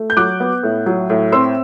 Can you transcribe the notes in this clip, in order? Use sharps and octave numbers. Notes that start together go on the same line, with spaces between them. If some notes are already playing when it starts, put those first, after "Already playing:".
Already playing: A3
G6
F#3 D6 F#6
B3
A2
F#3
A2
C4 C6 E6